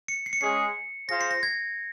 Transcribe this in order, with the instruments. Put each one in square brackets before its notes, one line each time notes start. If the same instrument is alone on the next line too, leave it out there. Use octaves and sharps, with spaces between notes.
[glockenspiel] C#7
C7
C#7
[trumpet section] G#3 C#4 G#4 D#5 [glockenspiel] C7
[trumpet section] F4 G#4 C5 F5 [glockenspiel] A#6
[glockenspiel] C7
A#6
G#6